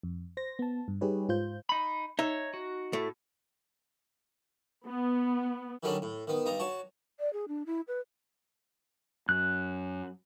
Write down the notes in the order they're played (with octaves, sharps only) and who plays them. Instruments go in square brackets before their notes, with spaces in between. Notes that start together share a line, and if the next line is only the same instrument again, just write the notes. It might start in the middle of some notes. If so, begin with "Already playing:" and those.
[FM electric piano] F2
C5 A#6
B3 A5
G2
G3 D#4 G4 G#4 B4 C#5
G#2 F4 C5 G6
[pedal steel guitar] D#4 B5
[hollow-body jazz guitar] D#4 E5 [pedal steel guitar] C#5
[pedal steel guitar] F#4
[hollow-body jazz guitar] A2 A3
[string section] B3
[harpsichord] D3 D#3 F#3 G3 C#4 D4
A2
D#3 B3
G2 D#4 A#5
F#4 C#5 A5
[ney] D5
G#4
D4
E4
B4
[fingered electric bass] F#2 [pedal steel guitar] F#6